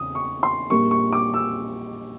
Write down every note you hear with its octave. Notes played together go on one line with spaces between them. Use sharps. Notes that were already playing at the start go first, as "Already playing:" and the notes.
Already playing: E2 C#3 D#6
C#6
C6
A#1 A#2 G3 A#3 C#6
C#6
D6
E6